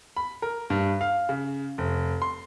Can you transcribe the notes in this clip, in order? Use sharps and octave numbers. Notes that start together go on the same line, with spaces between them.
B5
A#4
G2
F5
C#3
F1
C6